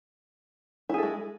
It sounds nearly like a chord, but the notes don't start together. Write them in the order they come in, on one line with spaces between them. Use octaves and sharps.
E4 G#4 A4 G#3